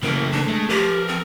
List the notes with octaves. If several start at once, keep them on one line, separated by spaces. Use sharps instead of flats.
C#3 E3 A3 A#3 A#4
D4
G#3 A3
F3 G4 A#4 B4
C4